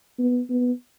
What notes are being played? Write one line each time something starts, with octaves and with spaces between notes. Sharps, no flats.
B3
B3